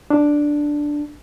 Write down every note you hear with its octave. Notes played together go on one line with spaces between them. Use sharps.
D4